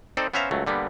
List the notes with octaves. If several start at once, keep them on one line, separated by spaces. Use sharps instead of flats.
C4 D#4 A4 C5 D5
B3 C#4 C5 E5 F5 A#5
C#2 F#3 A3
D3 G3 A#3 B3